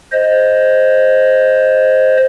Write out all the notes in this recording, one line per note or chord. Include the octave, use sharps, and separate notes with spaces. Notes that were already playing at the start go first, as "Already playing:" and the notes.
C5 D#5